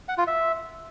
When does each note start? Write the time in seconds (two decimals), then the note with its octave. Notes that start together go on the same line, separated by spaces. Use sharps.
0.09 F#5
0.18 F4
0.27 E5